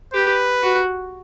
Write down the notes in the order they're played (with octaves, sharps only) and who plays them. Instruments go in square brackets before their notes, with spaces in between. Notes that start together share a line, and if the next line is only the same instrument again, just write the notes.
[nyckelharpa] G4 [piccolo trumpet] B4
[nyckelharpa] F#4